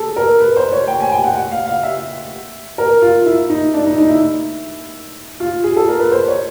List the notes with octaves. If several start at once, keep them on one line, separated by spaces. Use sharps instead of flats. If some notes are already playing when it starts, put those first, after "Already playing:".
Already playing: G#4 A4
A#4
B4
C5
C#5
G5
G#5
G5
F#5
F#5
F5
F5
E5
A#4
F4
E4
D#4
D4
D#4
D#4
E4
F4
G#4
A4
A#4
B4
C5
C#5